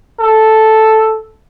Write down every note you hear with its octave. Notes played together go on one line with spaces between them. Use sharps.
A4